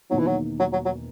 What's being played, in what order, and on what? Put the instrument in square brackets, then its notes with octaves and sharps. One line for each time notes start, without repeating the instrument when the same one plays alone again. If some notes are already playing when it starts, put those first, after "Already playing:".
[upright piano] E1 E2 D#3 A#3 D#4 [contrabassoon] F#3
[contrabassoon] E3
F#3
F#3
F#3
F#3